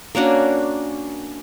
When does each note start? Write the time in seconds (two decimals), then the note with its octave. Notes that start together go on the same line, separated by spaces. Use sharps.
0.15 A#3 C#4 D4 F#4